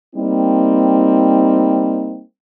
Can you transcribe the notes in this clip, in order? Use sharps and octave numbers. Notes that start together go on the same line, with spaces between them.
G3 A#3 C4 D#4